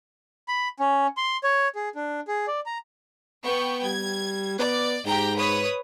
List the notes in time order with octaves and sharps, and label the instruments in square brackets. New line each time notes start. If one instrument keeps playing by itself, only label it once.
[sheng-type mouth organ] B5
C#4
C6
C#5
G#4
D4
G#4
D5
A#5
[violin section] B3 G5 C#6
[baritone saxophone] G3 [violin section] G#6
[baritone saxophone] B3 [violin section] D5
[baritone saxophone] G#2 [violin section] G4 G5 A#5
[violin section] B4 C#5 D#6